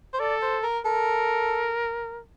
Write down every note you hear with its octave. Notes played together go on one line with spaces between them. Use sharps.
C5
A4 D5
C5
A#4
A4 A#4